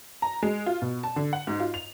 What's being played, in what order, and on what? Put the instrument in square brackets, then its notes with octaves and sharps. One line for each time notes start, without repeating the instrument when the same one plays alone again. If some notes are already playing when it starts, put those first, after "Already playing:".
[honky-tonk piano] A#5
G#3
F4
B2
A5
D3
F#5
G#2
F4
F7